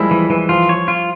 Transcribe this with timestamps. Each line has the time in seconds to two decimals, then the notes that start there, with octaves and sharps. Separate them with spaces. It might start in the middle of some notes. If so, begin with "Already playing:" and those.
Already playing: F3 G3 G#3 A#3 E4
0.11 E3
0.30 E3
0.49 F3 F4
0.69 C#5
0.88 F4